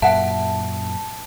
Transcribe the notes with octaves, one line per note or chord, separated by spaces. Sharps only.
F#2 A#2 E5 F#5 A5